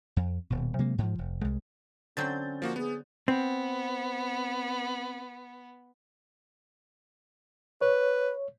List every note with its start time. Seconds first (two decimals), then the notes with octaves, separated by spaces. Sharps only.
0.16 F2
0.50 D#1 B2
0.79 C3 F#3 G#3 A#3
0.98 G#2 F3
1.18 F1
1.41 C2 G#3
2.17 D3 F#3 C4 C#4 G6 A6
2.62 F3 A#3 F#4
2.76 B3 G#4
3.28 B3 C4
7.81 B4 C#5